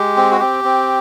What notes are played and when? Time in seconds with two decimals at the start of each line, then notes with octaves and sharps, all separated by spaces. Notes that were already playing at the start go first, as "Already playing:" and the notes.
Already playing: G#3 G4
0.17 C4
0.31 F#4
0.40 C4 G4
0.64 C4